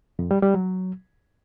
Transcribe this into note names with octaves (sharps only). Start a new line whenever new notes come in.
F2
G3
G3
F#3